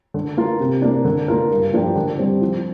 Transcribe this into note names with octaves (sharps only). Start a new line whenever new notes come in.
D3
A#3 F4 A#4
C3
A#3 D4
D3
A#3 F4 A#4
G2
F3 A#3 D4 G4
D3
G3 C4
F3